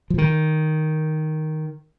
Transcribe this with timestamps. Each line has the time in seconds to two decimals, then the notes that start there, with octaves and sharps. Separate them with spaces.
0.10 F3
0.18 D#3